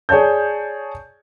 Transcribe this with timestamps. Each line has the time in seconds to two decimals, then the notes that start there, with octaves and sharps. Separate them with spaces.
0.09 G#4 C#5 D5 A5 G6